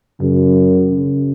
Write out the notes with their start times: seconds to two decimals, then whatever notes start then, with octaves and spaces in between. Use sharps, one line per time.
0.21 F#2 C#3
0.91 C#3